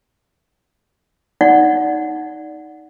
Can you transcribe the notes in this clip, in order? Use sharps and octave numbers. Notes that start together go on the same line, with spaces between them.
D#4 D5 F#5